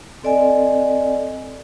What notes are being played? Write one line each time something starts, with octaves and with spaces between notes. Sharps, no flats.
C4 A4 D5 D#5 G#5